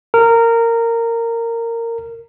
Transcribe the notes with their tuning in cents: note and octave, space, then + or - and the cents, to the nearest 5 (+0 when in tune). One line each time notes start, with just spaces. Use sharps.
A#4 -15